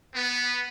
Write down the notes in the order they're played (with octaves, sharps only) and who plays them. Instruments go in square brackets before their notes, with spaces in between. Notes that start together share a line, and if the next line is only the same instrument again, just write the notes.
[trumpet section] B3